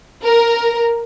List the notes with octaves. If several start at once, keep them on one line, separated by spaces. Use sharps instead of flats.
A#4